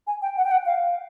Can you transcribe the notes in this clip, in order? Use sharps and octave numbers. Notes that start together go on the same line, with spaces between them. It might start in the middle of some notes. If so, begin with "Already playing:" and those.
G#5
G5
F#5
G5
F#5
F5